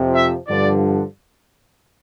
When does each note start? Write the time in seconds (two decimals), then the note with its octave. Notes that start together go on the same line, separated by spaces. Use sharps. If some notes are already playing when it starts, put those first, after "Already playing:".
Already playing: F2 C3 F3
0.15 E5
0.47 G2 D3 F3 D5